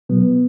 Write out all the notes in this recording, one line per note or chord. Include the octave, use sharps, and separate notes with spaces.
B2 F#3 B3